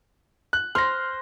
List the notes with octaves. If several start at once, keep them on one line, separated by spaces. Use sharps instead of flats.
F#6
C5 F6 A#6